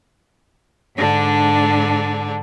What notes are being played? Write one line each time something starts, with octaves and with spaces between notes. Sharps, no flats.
G#2 D3 D4